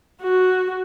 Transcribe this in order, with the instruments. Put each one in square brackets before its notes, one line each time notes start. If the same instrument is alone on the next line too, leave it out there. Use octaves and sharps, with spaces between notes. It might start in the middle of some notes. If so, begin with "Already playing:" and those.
[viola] F#4